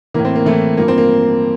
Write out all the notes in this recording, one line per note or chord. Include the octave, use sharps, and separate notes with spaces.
A2 E3 A#3
C4
A#3
A2 E3 A3
G2 F3 A#3
C4
A#3